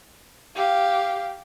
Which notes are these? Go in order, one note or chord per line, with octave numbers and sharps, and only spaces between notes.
G4 F5